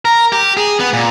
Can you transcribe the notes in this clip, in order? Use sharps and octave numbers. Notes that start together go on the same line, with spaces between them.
A#4
G4
G#4
B3
A#2